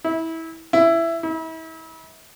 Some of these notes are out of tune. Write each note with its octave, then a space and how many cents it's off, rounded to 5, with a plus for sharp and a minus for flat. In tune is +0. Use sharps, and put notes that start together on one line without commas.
E4 -20
E4 +15
E4 -35